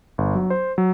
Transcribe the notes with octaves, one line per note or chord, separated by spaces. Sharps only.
G1
F#3
C5
F#3